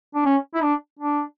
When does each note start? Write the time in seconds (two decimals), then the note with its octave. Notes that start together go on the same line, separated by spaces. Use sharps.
0.15 D4
0.25 C#4
0.54 E4
0.62 D4
0.99 D4